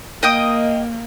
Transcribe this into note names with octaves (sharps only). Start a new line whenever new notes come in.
A#3 D#5 G5 D#6